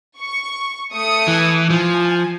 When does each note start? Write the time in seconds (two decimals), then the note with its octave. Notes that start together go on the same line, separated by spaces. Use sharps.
0.19 C#6
0.92 A3 D#6 C#7
1.28 E3
1.70 F3 G#5